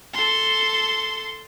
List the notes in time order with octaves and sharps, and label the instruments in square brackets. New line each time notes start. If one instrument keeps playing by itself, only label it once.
[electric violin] A4 C6